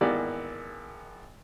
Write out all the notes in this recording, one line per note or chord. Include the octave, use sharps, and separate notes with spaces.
G#1 E3 A#3 B3 D5